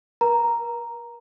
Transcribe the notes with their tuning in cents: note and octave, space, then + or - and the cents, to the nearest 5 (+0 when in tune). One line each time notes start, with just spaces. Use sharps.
A#4 +45 A#5 +0